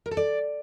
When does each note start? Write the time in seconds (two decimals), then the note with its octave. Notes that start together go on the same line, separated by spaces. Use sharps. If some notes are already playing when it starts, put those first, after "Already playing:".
0.06 A#4
0.11 A4
0.17 D5